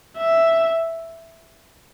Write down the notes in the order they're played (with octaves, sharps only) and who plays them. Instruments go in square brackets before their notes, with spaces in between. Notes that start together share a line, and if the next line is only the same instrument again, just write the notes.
[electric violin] E5